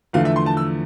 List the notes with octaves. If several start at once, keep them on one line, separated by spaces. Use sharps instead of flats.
E2 D3 F3 A3 F5
E5
C6
A5
E6